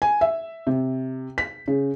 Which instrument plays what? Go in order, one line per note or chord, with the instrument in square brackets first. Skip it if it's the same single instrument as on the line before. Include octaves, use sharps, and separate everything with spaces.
[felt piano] G#5
E5
C3
B6
C#3